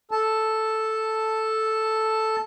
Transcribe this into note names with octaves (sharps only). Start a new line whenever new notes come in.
A4 A5